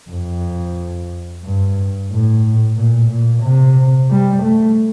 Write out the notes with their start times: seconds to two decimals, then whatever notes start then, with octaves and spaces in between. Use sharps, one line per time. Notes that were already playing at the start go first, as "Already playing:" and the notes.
0.10 F2
1.44 G2
2.10 A2
2.77 A#2
3.10 A#2
3.43 C3
4.10 G3
4.43 A3